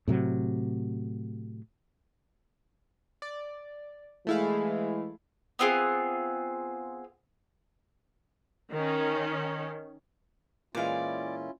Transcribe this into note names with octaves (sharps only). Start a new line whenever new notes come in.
A2 C3 F#3
D5
E3 G#3 A3 E4 F5
B3 C4 F4 G#4
D#3 C#4
A#2 E3 G#3 C#4 E4 F4 D5 F5